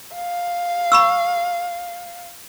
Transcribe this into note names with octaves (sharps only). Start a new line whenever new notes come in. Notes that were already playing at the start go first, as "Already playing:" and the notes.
F5
B5 C#6 E6